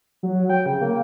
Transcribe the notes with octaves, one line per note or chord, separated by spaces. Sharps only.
F#3
G5
C#3
A#3